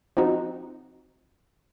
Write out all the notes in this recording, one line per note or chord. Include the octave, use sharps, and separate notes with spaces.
F3 C4 D#4 F#4